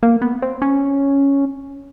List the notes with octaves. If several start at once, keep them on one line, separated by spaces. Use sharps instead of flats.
A#3
B3
C4
C#4